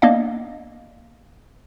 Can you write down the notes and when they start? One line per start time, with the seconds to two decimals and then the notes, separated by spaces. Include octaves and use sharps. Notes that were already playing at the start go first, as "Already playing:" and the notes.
0.02 A#3 B3 D4 D5 D#5 F5